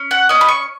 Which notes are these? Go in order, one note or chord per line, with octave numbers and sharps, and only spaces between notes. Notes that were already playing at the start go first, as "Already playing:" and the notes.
Already playing: C#4
F#5
C#4 D#5
B5
C#6